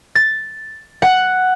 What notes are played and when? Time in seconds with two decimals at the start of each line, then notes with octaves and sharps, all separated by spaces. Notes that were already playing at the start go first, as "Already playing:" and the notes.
0.15 A6
1.02 F#5